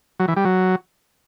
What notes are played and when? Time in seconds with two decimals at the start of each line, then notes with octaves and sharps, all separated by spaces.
0.20 F#3
0.28 E3
0.36 G3
0.45 F#3